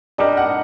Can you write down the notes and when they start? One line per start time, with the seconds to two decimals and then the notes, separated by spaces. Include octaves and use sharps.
0.18 G3 D4 G4 A#4 D#5
0.37 F#5